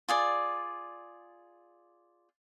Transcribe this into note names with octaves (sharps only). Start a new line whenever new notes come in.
F4 G#4 D5